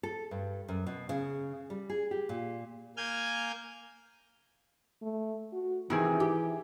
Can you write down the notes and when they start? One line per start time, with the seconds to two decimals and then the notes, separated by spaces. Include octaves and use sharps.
0.03 A4
0.31 G2
0.68 F#2
0.87 B2
1.09 C#3
1.70 G3
1.90 G#4
2.11 G4
2.29 A#2
2.97 A#3 G#5 F6 G6 G#6
5.02 A3
5.53 F#4
5.90 C3 D#3 E3 D#4 E4 G#4
6.20 G4